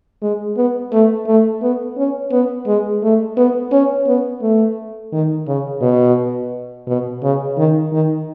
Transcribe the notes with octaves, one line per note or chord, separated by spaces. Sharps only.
G#3
B3
A3
A3
B3
C#4
B3
G#3
A3
B3
C#4
B3
A3
D#3
C#3
B2
B2
C#3
D#3
D#3